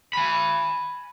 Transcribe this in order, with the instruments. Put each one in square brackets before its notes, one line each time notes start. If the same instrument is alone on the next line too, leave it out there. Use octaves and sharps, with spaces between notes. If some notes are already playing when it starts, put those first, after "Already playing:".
[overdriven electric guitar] G#5 B5